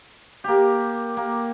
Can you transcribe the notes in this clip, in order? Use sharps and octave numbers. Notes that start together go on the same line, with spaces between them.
A#3 G4
A#3